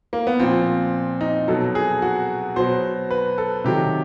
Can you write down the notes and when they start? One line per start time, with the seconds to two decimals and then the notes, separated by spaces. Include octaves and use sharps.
0.13 A#3
0.27 B3
0.39 A#2 F3 C4
1.21 D#4
1.48 B2 F#3 A4
1.75 G#4
2.02 F#4
2.56 B2 F#3 C5
3.11 B4
3.38 A4
3.64 C3 D#3 F#3 G4